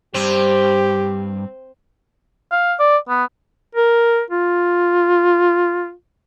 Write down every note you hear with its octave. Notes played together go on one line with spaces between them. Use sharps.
G2 C4 G4
F5
D5
B3
A#4
F4